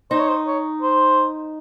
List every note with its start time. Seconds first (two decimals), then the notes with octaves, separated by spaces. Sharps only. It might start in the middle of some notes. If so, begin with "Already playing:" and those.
0.11 D#4 C5
0.20 C#5
0.29 C5
0.47 C#5
0.82 C5